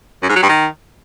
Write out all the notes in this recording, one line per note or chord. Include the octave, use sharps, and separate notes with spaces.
F#2
G#2
F#3
G2
D#3